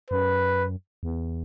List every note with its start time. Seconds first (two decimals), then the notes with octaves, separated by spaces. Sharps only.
0.10 F#2 B4
1.03 E2